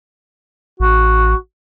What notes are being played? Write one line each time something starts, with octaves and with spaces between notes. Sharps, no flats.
A1 F#4